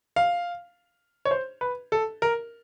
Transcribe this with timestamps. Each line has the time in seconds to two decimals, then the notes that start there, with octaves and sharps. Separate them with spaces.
0.16 F5
1.25 C#5
1.31 C5
1.61 B4
1.92 A4
2.22 A#4